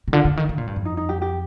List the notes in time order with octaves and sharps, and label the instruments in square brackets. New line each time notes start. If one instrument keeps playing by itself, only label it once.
[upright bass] C3
[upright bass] D3 [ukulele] F4
[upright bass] D3
D#3
D3
A#2
G2
F2
[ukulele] D#4
D#4
G4
G4